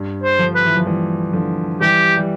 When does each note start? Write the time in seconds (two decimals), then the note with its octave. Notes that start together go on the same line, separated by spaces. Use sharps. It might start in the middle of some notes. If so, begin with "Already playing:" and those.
Already playing: G2
0.23 C5
0.39 D3 F3
0.55 B4
0.66 E3
0.77 F3
0.86 E3 G3
1.33 D3 F3
1.81 E3 G3 G4
2.17 G3